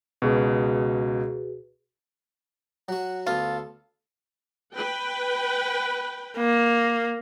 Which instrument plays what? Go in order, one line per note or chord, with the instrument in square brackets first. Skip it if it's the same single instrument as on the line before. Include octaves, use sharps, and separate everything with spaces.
[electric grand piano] C#2 B2 [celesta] F#4 G#4 B4
[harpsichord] F#3 F#4 [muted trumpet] F#5
[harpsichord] D2 B3 [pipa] F4 [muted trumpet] A4
[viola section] B4 G5
[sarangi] A#3